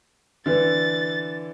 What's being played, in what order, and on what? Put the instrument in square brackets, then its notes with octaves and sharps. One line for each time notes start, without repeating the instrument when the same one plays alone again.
[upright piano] D3 E3 [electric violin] A6